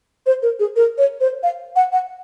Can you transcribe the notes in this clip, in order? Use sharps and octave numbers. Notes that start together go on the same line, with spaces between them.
C5
A#4
G#4
A#4
C#5
C5
F5
F#5
F#5